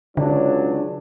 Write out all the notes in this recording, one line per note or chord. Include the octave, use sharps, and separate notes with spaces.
C#2 D3 F#3 D4